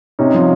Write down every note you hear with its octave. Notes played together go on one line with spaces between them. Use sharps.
C3 C#4 D#4
F3